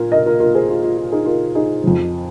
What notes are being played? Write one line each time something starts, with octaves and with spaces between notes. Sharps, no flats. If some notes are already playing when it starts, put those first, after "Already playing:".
Already playing: A#2 F4 A#4
A#4 D#5
F4 A#4
F4 A#4
G#4 C5
F4
F4
F4
D#4 G#4
F4 A#4
D#4 G#4
F2 F3